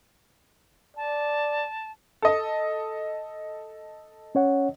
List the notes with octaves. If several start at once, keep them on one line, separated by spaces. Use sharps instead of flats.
D5 A5
A4 D#5
C#4 C#5 F#5